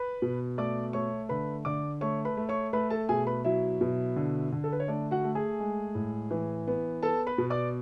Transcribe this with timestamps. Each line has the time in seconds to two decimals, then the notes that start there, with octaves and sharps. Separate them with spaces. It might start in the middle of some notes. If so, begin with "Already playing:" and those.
Already playing: B4 B5
0.22 B2
0.58 A3 D5 D6
0.93 A3 C#5 C#6
1.29 D3 B4 B5
1.65 D3 D5 D6
2.01 A3 C#5 C#6
2.25 B4 B5
2.37 A3
2.49 C#5 C#6
2.73 A3 B4 B5
2.90 A4 A5
3.09 B2 G#4 G#5
3.27 B4 B5
3.44 F#3 E4 E5
3.81 B2
4.16 D3
4.52 D3
4.64 A4
4.73 B4
4.80 C#5
4.88 A3 D4 D5
5.11 F#4 F#5
5.24 A3
5.35 G#4 G#5
5.60 G#3
5.95 A2
6.31 E3
6.68 B3
7.03 B3 A4 A5
7.27 B4 B5
7.38 B2
7.50 D5 D6